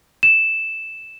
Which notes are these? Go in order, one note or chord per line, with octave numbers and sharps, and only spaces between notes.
E7